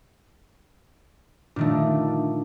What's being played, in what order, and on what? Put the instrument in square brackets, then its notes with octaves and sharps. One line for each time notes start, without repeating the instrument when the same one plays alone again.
[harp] A#2 D#3 A3 [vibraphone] D4